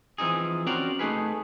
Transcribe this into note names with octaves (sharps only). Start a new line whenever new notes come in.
E3 F3 C4 D#4 G#4
C4 C#4 F#4 A#4 C5 D5
A3 D#4 G#4 B4